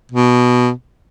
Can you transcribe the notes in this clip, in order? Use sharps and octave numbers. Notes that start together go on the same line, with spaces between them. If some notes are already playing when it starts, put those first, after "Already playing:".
B2